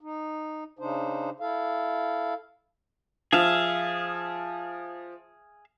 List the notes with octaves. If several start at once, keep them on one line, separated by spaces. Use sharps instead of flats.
D#4
C#3 D4 D#4 C5
E4 A4 F5
F3 G#4 E5 F5